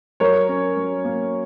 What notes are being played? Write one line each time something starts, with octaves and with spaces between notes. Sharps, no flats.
F#3 A#4 C#5
C#4
F#3
A#3